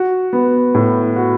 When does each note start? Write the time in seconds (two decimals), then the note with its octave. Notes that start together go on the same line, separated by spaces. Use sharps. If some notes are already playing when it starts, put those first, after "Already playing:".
Already playing: F#4
0.33 B3
0.75 A2
1.16 F#4